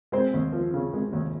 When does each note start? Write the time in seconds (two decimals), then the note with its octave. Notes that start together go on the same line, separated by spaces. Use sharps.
0.12 G#3 C4 C5
0.34 D#2
0.52 F3
0.74 C#3
0.93 G#3
1.13 D#2